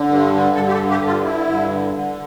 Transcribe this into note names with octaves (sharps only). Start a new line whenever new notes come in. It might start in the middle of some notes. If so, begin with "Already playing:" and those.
Already playing: D3
G2
D3
G2 A4
G4
A4
D3
G4
G2
F4
D3 E4
G2
D3
D3